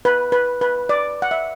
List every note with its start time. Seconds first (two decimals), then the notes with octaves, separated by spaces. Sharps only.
0.05 B4
0.32 B4
0.61 B4
0.89 D5
1.22 F#5
1.31 E5